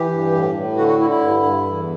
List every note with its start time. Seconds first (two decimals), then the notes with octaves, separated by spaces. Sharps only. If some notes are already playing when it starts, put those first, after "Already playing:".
Already playing: E3 G4
0.11 G2
0.32 A2
0.55 A2
0.76 D3 F#4
0.88 F#4
0.99 D3 E4
1.10 E4
1.21 G2
1.43 G2
1.65 E2